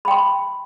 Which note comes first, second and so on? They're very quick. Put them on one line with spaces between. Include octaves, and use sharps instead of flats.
B5 G5 C6